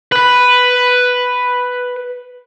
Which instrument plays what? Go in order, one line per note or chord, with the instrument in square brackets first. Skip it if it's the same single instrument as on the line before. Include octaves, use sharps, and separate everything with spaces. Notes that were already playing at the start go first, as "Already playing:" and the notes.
[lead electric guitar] B4 B5